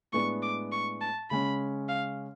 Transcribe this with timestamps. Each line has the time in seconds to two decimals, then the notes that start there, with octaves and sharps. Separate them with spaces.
0.13 A2 G#3 B3 D4 C#6
0.43 D6
0.72 C#6
1.01 A5
1.30 C#3 G#3 C#4 B5
1.89 F5